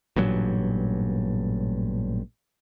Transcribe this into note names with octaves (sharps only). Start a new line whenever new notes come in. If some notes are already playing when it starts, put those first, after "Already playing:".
A1 G2 A#2 F#3